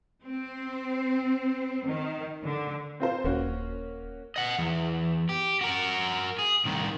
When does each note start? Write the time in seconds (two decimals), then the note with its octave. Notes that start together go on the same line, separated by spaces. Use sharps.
0.23 C4
1.85 D#3
2.44 D3
3.00 C4 F4 C5
3.25 D#1 A#3 C#4 F#4
4.36 D#5 F#5
4.58 E2
5.29 G4
5.61 F#4 A#4
6.39 G#4
6.65 C2 D#3